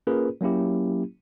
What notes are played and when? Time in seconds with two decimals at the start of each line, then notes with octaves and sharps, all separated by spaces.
0.07 A#3 C#4 F4 G#4 A#4 B4
0.41 F#3 A#3 C#4 E4 G4